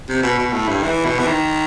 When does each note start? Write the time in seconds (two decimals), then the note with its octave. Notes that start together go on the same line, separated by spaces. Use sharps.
0.09 C3
0.23 B2
0.39 B2
0.53 A2
0.68 G2
0.83 E3
1.05 B2
1.20 E3
1.27 D#3